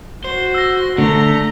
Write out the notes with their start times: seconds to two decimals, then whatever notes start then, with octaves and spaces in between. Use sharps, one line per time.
0.24 F#4 C5 G7
0.54 E6 A#6
0.98 D3 A3 A#5